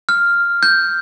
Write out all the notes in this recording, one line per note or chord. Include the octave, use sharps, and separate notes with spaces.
F6
G6